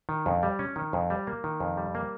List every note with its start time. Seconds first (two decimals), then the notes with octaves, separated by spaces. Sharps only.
0.09 D#3
0.26 F2
0.43 G3
0.59 C#4
0.76 D#3
0.93 F2
1.10 G3
1.27 A#3
1.44 D#3
1.60 F2
1.77 G3
1.95 A#3